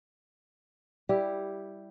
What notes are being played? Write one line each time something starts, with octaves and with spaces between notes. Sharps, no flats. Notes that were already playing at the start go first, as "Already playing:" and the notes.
G3 E4 G4